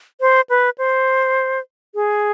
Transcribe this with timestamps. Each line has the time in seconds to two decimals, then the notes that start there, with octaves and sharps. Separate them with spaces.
0.21 C5
0.50 B4
0.78 C5
1.95 G#4